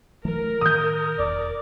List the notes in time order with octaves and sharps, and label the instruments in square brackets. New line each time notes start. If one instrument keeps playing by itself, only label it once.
[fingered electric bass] E3 F#3 A3 [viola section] A#4
[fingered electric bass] A2 D#3 [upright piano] D#6 G6
[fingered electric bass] E1 E2 [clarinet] D5